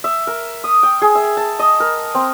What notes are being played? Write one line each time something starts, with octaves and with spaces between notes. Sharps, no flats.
E5
A#4
D#6
G5
G#4
E5
A5
D#5
A#4
C4